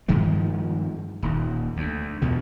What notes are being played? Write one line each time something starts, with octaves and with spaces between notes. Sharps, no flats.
G2 D#3 F3 G#3
D#1 D#2
D2
E2 G2 B2 D3